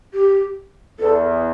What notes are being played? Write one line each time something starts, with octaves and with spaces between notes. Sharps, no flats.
G4
E2 A4